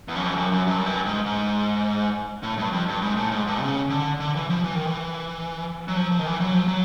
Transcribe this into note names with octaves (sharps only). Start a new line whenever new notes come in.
E2
F#2
F2
F#2
F#2
G2
F#2
G2
G#2
G#2
A2
G2
F2
G2
G#2
A2
G#2
G2
C#3
D3
D3
E3
F3
E3
D#3
E3
F#3
F3
F3
D#3
E3
F#3
F3
F#3